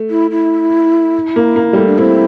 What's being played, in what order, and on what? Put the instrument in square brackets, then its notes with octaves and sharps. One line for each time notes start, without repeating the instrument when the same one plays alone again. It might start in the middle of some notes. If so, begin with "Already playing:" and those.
Already playing: [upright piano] A3
[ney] E4
E4
[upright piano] A#3
A#3
G3
A3
[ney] D4
[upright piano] C4 [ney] E4